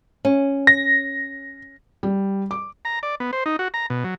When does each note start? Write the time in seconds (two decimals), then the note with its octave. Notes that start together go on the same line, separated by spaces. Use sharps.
0.25 C#4
0.67 A#6
2.03 G3
2.51 D6
2.85 A#5
3.03 D5
3.20 B3
3.33 C5
3.46 D#4
3.59 F#4
3.74 A#5
3.90 B2
4.04 F#3